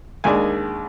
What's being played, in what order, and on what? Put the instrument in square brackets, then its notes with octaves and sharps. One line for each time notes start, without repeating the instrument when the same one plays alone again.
[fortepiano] D#2 D#3 G#3 D4 G#5